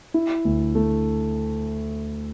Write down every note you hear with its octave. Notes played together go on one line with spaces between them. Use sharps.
E4
D2
A3